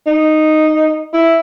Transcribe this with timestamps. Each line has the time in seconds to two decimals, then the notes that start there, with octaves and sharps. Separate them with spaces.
0.07 D#4
1.14 E4